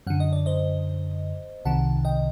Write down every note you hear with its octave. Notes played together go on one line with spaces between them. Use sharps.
F#2 D3 F#5
D#5
D5
C5 D#5
C2 C3 D#3 F#5 A5
D#5 G5